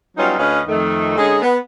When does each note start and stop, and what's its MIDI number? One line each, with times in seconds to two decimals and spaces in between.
0.17 0.38 54
0.17 0.38 55
0.17 0.38 59
0.17 0.38 61
0.17 0.38 63
0.17 0.38 65
0.39 0.61 38
0.39 0.61 61
0.39 0.61 71
0.39 0.61 73
0.39 0.61 75
0.39 0.61 77
0.68 1.16 41
0.68 1.16 51
0.68 1.16 57
1.17 1.40 50
1.17 1.40 56
1.17 1.40 61
1.17 1.40 63
1.17 1.40 68
1.42 1.57 59